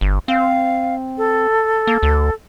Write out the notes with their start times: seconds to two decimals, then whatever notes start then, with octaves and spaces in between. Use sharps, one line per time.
0.01 G1
0.28 C4 F5
1.18 A4
1.87 A#3
2.03 D2